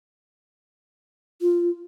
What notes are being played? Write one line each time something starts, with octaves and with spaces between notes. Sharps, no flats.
F4